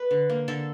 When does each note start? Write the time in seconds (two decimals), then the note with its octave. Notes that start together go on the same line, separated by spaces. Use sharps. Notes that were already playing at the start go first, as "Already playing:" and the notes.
Already playing: B4
0.11 D3
0.30 A#3
0.48 D3 A4